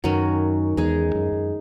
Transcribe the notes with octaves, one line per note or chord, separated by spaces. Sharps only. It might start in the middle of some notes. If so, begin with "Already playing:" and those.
F#2 D#3 F#3 C#4
E2 G#3 D#4 G#4
F#2
F#2